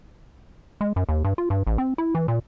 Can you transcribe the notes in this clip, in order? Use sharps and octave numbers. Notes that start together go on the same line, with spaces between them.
G#3
F#2
D#2
G2
F4
G2
A1
C4
E4
E3
A#2